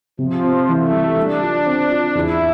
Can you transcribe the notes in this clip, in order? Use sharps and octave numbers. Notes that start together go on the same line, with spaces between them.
C3 F3
C4
E3 A3
G3
G3 D4
F4
C4
F4
E2 E4